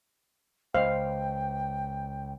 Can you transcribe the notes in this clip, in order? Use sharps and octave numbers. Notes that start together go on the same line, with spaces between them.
C#2 C5 D#5 F5 G5